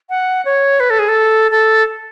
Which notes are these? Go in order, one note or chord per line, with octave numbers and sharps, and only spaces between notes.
F#5
C#5
B4
A4
G#4
A4
A4